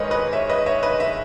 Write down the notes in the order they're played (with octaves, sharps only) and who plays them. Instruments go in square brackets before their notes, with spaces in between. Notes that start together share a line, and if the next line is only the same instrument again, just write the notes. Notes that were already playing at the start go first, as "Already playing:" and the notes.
Already playing: [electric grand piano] G#2 D#3 G#3 [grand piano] B4 C#5 D#5
[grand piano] B4 D#5
C#5 E5
B4 D#5
C#5 E5
B4 D#5
E5